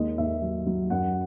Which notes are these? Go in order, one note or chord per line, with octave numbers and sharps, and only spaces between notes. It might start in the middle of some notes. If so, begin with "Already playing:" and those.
Already playing: D#2 G#3 D#5
D#2 E5
F#3
F#3
F#2 F#5